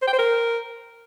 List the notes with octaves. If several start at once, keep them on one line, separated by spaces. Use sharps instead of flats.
C5
G5
C5
A#4